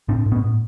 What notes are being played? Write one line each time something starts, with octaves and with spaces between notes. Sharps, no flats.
A2 C4 D4
A2
B3 C#4
A2